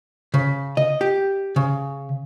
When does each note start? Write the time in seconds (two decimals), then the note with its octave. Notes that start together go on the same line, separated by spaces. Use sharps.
0.34 C#3
0.77 D#5
1.01 G4
1.56 C#3